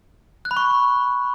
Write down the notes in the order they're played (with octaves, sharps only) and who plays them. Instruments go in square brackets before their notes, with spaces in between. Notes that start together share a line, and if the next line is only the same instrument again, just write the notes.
[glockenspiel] F#6
B5
C#6